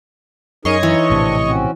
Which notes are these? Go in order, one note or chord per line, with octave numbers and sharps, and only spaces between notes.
F#2 D#4 G#4 A#4 C#5 D#5 C6 C#6
E3 D#4
A#1 A2 C3 C4 D4
C4 C#4 F#4